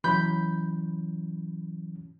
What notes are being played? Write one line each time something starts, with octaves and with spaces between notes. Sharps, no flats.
E3 F#3 C#4 B5 G6